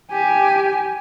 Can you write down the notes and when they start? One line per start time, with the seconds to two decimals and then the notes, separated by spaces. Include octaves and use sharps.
0.10 G4 G#5